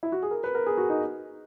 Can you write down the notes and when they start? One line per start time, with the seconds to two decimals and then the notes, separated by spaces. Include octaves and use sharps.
0.03 E4
0.12 F#4
0.23 G#4
0.31 A#4
0.44 B4
0.55 A#4
0.66 G#4
0.78 F#4
0.90 D#4